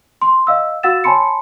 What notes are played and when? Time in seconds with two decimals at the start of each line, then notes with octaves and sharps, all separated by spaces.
0.21 C6
0.47 D#5 F5 E6
0.83 F#4 F5 F#5 E6 A6 E7
1.04 C#5 G#5 A5 B5 C6 C#7